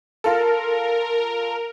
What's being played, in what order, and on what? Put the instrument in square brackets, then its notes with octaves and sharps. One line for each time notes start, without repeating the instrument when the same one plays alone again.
[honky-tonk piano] F4 A4 [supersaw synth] A#4